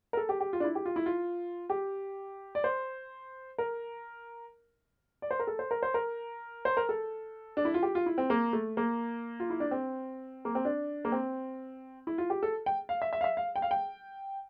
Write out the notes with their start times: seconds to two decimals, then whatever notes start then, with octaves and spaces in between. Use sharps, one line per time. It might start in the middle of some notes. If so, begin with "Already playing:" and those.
0.13 A#4
0.17 A4
0.29 G4
0.41 G4
0.53 F4
0.60 D4
0.64 E4
0.75 G4
0.86 F4
0.96 E4
1.06 F4
1.70 G4
2.55 D5
2.64 C5
3.58 A#4
5.22 D5
5.31 C5
5.40 A#4
5.47 A4
5.59 C5
5.71 A#4
5.83 C5
5.94 A#4
6.65 C5
6.77 A#4
6.89 A4
7.57 D4
7.65 E4
7.74 F4
7.83 G4
7.95 F4
8.06 E4
8.18 C4
8.30 A#3
8.53 A3
8.77 A#3
9.40 F4
9.50 E4
9.60 D4
9.71 C4
10.45 A#3
10.55 C4
10.65 D4
11.05 A#3
11.12 C4
12.07 E4
12.18 F4
12.30 G4
12.43 A4
12.66 G5
12.89 F5
13.02 E5
13.13 E5
13.21 F5
13.24 E5
13.37 F5
13.56 G5
13.62 F5
13.71 G5